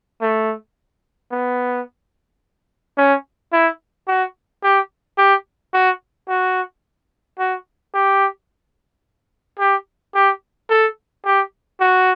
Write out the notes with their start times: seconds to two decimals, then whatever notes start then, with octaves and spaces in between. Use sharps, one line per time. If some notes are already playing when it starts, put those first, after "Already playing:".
0.21 A3
1.31 B3
2.98 C#4
3.53 E4
4.08 F#4
4.63 G4
5.18 G4
5.74 F#4
6.28 F#4
7.39 F#4
7.94 G4
9.59 G4
10.15 G4
10.70 A4
11.25 G4
11.80 F#4